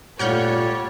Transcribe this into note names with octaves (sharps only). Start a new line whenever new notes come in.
A#2 G3 A3 F4 C#5 F#5 F6 G6